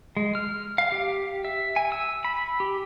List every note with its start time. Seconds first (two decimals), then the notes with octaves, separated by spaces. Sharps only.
0.17 G#3
0.35 F6
0.78 F5
0.92 G4
1.45 E5
1.76 G#5
1.92 E6
2.24 B5
2.60 G4